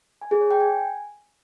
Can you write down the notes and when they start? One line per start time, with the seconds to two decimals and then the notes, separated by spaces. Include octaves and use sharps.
0.21 G#5
0.31 G#4
0.41 C#5
0.51 G5
0.60 G#5